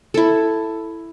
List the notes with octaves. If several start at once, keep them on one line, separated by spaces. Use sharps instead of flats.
E4 A4